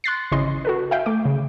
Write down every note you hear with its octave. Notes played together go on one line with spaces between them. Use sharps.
C6 F#6 A6 C7
G#1 C#3 C#4 E4 D#5 C6
F#4 A4 B4
E5 F5 G5
A3 D6
C#3